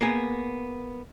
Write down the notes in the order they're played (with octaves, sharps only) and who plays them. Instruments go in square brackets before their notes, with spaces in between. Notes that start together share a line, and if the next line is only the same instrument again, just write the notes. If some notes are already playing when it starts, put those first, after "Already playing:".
[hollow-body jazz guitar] A#3 B3 G#4